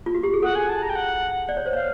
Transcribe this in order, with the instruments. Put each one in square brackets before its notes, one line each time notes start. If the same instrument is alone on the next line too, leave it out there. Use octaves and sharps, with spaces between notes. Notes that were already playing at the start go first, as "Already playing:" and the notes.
[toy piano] F4
F#4
G4
G#4
[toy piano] A4 [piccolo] F#5
[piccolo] G#5
A5
A#5
G5
F#5
[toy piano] D5
C#5
C5
[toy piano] C#5 [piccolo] F5